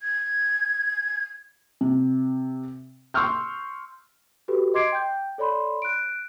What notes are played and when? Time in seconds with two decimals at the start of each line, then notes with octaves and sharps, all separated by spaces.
0.01 G#6
1.81 C3
3.14 C6 C#6 E6 F6 G6
4.48 F#4 G4 A4 B4
4.74 D#5 C6 D6 G#6 C7 D7
4.92 G5 G6
5.38 A4 C#5 D5 B5 C6
5.82 F#6 D7